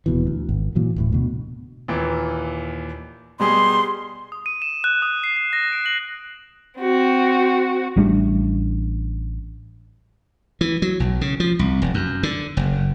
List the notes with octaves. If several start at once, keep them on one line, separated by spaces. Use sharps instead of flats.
D#1 B2 E3
D2
G#1
A#2 E3 F#3
D1 A1 A2
D2 B2
D#2 A#2 E3
B2 G3 G#4 C6
D#6
D#7
E7
F#6
D#6
C7
C7
A#6
D7
F#7
C4 F#4
A1 G3 A3 D4
E3
F#3
B1
C#3
F3
C2
F1
F#2
D3
F#1